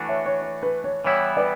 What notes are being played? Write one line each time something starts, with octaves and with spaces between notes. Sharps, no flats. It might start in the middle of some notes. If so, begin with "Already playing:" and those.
Already playing: E3 A3 D4 F#4
C#5 E5
C#5
C#5
B4
C#5
E3 G3 B3 E4 C#5
B4 D5